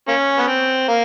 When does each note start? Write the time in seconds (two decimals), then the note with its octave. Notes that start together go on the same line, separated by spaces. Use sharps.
0.08 A#3 C#4
0.38 B3
0.47 C4
0.88 A#3